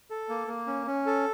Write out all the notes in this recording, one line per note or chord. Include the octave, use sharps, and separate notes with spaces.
A4
A#3
A#3
C#4
C#4
A4